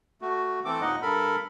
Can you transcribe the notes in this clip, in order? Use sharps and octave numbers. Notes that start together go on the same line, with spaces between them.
A3 F#4
E3 A3 C4 A4 D6
D#2 A#2 D#4 D#5 F#5
G2 A4 A#4 B5